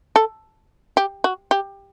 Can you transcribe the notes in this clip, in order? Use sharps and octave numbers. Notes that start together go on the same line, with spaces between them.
A4
G4
F#4
G4